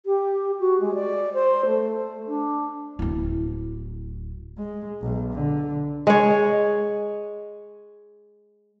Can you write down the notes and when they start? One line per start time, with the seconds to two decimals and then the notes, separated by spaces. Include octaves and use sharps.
0.06 G4
0.60 F#4
0.80 G#3
0.94 D5
1.34 C5
1.66 A3
2.26 D4
2.99 D1 E4
4.58 G#3
5.01 B1
5.34 D3
6.07 G#3 C#5